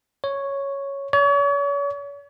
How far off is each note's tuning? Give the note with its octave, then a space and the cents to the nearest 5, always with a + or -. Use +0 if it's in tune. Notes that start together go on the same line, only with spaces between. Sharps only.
C#5 +0
C#5 +40